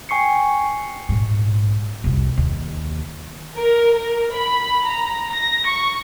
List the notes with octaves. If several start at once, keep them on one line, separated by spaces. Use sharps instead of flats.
G5 G#5 C#6 C7 C#7
A#1 G#2
C2 F2
D#2
A#4
A#4
B5
A#5
A#6
C#6